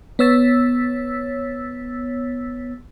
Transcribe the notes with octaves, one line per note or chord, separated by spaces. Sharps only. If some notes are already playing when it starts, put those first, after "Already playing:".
B3 C#5 E6 A6 B6